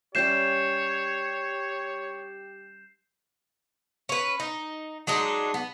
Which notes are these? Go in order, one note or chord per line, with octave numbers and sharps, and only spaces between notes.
G3 C#4 G4 C#5 E5 G6 C7 E7
C#4 B4
D#4
F#3 G#3 D4 D#4
B3